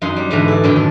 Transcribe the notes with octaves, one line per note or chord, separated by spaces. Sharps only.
F#2 D#4 F5 F#5 C6
G3
E2 G#2 D3 E3 B4 A#5
E4 D5
F#2 A2 D3 D#3 A#4 G5
A4